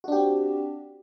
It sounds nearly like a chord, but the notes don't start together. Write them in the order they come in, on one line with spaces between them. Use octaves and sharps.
F#4 D4 G4 C4